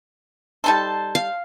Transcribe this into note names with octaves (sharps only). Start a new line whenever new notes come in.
G3 D#4 A4 C5 A5
F5